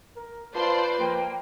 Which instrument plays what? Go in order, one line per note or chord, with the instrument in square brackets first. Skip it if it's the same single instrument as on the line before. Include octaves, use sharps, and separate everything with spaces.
[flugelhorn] A#4
[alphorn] F4 [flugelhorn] B4 [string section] C5 D5 C6 [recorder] A5
[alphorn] F3 [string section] A#3 [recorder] G5